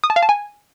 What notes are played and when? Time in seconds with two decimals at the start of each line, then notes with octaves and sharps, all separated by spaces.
0.04 D#6
0.10 A5
0.16 F5
0.23 A5
0.29 G#5